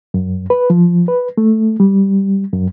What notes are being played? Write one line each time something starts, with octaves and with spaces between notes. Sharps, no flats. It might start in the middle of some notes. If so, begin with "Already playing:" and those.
F#2
B4
F3
B4
A3
G3
F#2